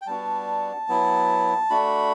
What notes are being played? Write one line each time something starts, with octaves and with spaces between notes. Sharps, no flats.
G5
G3 B3 D4 F#4 A5
F#3 B3 E4
A3 D4 F#4 B5